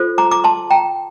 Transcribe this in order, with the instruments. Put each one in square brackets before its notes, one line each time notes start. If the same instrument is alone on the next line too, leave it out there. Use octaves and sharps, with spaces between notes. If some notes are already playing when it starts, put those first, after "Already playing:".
Already playing: [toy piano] F4 A4 C5
A#5 D6
A#5 D6
A5 C6
G5 A#5